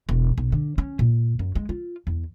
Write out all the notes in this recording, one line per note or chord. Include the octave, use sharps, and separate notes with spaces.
E1
B1
D3
C#4
A#2
F#2
G#3
F4
E2